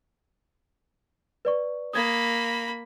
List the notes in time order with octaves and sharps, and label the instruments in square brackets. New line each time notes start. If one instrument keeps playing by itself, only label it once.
[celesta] B4 D5 C#6
[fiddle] A#3 B5 [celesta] D#6 G#6